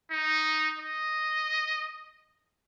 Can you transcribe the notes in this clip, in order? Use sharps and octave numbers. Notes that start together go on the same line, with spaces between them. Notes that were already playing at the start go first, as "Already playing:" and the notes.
D#4
D#5